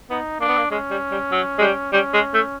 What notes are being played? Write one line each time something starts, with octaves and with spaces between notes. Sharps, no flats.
B3 D#4
A#3 D4
B3
A#3
G#3 C#4
G3
G3
F#3
G#3
G3
G3 C#4
G#3
A3